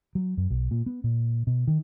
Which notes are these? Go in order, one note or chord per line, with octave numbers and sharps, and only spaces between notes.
F#3
F#2
B1
A#2
B3
A#2
B2
D#3